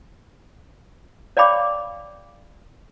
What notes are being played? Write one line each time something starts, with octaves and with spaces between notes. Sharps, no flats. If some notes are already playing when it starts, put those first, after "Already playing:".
C#5 D5 F5 G5 B5 D6